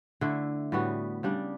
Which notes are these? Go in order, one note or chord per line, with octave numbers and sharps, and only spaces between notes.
D3 A3 E4
A2 G3 B3 F#4
C#3 G3 D4